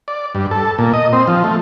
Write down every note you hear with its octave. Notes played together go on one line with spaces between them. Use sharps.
D5
G2
A4
A#2
D#5
C4
F3
A3